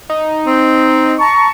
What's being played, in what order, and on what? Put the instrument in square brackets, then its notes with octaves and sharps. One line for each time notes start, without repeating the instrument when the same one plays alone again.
[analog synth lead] D#4
[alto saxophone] C4
[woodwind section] A5 A#5 C#6